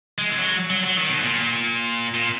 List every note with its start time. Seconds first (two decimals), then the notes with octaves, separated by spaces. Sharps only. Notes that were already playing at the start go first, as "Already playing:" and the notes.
0.18 G#3
0.29 E3
0.37 F#3
0.70 F#3
0.84 F#3
0.97 D#3
1.09 B2
1.22 A#2
2.14 A#2